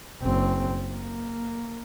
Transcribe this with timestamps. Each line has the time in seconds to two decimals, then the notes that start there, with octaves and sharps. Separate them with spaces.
0.22 F#1 C4
0.91 A#3